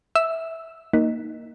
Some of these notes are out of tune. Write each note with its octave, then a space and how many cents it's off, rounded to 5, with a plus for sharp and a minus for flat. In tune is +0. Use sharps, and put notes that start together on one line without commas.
E5 -10 E6 +0
A#3 +0 D#4 +0